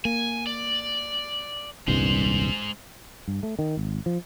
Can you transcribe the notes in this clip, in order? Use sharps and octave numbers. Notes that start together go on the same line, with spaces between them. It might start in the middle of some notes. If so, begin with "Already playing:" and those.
A#3 G#5
D5
D#1 C2 G2 G#3 C5
G2
A3
D#3
G#1
F3